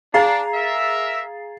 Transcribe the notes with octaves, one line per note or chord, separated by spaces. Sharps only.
D4 G#4 F5 A#5 A6 C7
A#4 E5